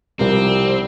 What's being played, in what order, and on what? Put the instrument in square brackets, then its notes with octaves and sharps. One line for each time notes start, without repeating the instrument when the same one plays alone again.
[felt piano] C2 F3 A#4 [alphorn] G3 [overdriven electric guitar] C4